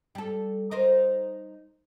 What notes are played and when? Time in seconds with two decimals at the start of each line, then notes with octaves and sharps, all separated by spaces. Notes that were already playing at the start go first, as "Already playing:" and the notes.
0.15 G3 A4
0.71 D#4 A#4 C5